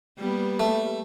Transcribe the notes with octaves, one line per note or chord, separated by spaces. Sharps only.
G3 A#3 B3
A3